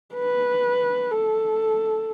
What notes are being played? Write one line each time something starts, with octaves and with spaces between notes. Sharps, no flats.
B4
A4